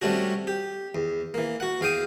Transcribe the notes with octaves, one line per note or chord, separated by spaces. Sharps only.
C3 G3 A3 C#4 D4 F#4
G4
E2
E3 A#3
F#4 F#5
E2 F5 G5 D#6